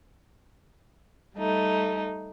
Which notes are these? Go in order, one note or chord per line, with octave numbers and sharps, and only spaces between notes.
G3 A3 D#4